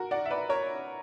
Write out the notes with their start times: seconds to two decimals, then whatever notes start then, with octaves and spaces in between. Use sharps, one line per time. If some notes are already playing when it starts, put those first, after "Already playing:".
Already playing: F#4 A#4
0.11 D5 F#5
0.26 E5
0.31 B4 D5
0.49 A#4 C#5